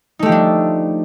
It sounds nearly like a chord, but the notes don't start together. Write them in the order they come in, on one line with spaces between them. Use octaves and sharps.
D#4 A3 G4 F3 D4